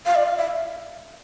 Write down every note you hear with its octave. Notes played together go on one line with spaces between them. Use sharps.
F5
D5
F5
E5